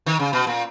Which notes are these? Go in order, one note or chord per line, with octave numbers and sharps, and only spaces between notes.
D#3
C#3
B2
A#2